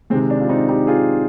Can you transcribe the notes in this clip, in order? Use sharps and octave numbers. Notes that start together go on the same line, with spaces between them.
C3 D#3 G#3 C4
D4
F4
C4 D#4
D#4 G4
F4 G#4